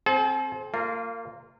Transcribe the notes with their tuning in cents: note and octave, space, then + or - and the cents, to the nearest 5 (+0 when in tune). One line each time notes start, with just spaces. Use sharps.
C4 +10 A4 -45
A#3 -30 F4 +0